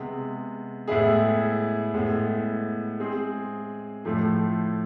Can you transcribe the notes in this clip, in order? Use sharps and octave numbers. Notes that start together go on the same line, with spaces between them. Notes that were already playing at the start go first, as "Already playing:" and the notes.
Already playing: C3 G#3 B3
A2 G#3 B3 E4 G#4
A2 G#3 B3
G#3 C4 G#4
A2 F3 A3